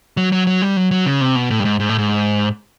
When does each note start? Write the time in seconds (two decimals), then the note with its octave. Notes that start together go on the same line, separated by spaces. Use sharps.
0.17 F#3
0.32 F#3
0.47 F#3
0.62 G3
0.77 F#3
0.91 F#3
1.06 C#3
1.21 C3
1.35 B2
1.51 A2
1.60 G2
1.65 G#2
1.80 G#2
1.89 A2
1.98 G#2